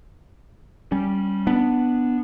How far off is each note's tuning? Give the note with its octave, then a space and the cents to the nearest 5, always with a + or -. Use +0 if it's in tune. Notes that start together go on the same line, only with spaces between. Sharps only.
G3 -5 C#4 +0
B3 +0 D4 +5